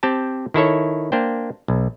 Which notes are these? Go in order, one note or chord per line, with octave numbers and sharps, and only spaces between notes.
C4 G4 G5 A5
D#3 E4 A4 C#5
A#3 D4 C5 G5
B1